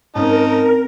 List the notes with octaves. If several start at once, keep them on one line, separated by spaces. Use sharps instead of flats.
G#2 C4 C#4 D#4 A#4 A5